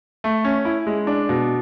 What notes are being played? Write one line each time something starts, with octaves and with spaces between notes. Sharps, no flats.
A3
C#4
E4
G#3
D4
B2